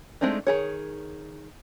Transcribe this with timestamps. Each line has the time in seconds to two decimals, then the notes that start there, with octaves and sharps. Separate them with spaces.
0.21 G#3 A3 C4 D4 D#4
0.47 D#3 G#4 C#5